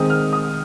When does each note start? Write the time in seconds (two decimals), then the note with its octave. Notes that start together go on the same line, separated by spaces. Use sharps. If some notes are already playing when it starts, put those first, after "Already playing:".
Already playing: D#3 G#3 C4 D#6
0.10 F6
0.33 D#6